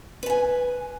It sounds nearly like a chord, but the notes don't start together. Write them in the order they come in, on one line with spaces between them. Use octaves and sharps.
B4 A5 G#5